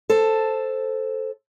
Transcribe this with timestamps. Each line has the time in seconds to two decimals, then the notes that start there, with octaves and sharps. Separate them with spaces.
0.09 A4 C5